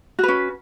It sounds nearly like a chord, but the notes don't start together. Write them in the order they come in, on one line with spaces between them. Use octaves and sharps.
F#4 B4 C#4